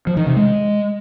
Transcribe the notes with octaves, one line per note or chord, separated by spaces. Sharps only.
F3
D#3
C3
G#3